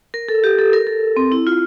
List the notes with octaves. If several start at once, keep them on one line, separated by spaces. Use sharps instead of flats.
A#4
A4
G4
A4
A#4
A4
C4
E4
F4